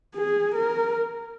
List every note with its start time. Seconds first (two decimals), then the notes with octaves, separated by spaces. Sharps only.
0.16 G#4
0.55 A#4